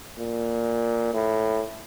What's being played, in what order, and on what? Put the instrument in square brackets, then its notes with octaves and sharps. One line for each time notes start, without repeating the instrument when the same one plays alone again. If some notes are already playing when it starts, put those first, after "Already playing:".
[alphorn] A#2
A2